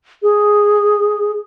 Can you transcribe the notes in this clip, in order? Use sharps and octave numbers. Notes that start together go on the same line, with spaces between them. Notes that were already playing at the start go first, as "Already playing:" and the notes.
G#4